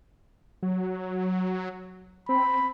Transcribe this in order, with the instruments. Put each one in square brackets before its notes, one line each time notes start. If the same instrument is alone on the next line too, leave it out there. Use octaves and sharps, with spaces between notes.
[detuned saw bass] F#3
[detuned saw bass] C4 [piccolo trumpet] B5